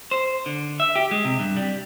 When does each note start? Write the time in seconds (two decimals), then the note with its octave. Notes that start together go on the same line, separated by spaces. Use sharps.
0.11 C5
0.46 D3
0.80 E5
0.96 G4
1.11 G#3
1.25 C3
1.40 G2
1.57 G3